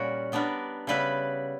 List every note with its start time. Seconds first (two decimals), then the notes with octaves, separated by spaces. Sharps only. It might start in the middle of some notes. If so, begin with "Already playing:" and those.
Already playing: A#2 G3 A#3 C#4 F#4 A#4
0.32 G3 B3 D4 A#4
0.87 C#3 G3 B3 E4 B4